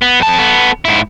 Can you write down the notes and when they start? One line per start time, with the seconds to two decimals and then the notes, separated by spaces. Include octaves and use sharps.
0.02 B3
0.20 F2 A5
0.38 B3 A4
0.85 G#2 E4